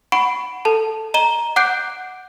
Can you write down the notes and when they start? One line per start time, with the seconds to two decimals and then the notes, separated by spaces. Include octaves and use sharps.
0.12 F#5 B5 C#6 D7
0.65 A4 A5
1.14 D#5 A#5 D#7 G7
1.56 F#5 D6 F#6 G6 C7 D7